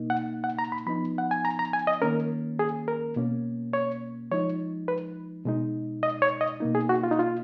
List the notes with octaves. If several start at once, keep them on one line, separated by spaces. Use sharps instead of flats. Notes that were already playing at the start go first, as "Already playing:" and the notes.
Already playing: B2 A#3 D#4
F#5
F#5
A#5
B5
F3 B3 D#4 B5
F#5
G#5
A#5
A#5
G#5
D#5
D#3 A#3 C#4 A#4
G#4
A#4
B2 A#3 C#4
C#5
F3 G#3 D#4 C#5
B4
B2 G#3 D#4
D#5
C#5
D#5
B2 A#3 D#4
G#4
F#4
F4
D#4
F4